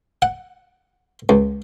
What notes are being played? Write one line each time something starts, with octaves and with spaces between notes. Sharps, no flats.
F#5
C#2